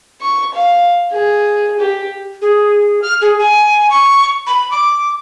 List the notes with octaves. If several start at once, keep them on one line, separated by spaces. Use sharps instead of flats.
C#6
F5
G#4
G4
G#4
F6
G#4
G#5
C#6
B5
D6